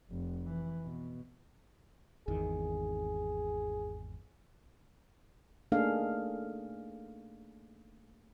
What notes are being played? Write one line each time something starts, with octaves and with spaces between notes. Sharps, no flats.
F1
E3
B2
G#1 E2 D#3 G#4
A3 A#3 D4 D#4 G#4 F5